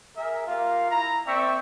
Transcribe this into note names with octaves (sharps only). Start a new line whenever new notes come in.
G#4 A#4 E5
A#3 F4 G4 A#4 F5
E4 A#5
A#3 C4 D5 E5 G5 C#6